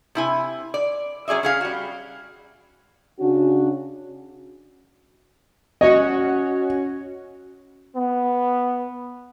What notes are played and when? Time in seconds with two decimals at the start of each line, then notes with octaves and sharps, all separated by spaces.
0.15 C3 E4 G#5
0.74 D5
1.28 F#3 C#4 G#4 D5 E5
1.43 C#4 G#4 F5
1.61 G3 F#4
3.20 C#3 C#4 D4 F#4
5.81 C#4 F#4 C#5 D#5
7.95 B3